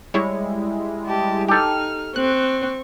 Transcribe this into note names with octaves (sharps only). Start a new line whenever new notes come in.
G3 G#3 E4 C#5
G4 A5
D#4 G4 A4 F6
C4 C#6 F#6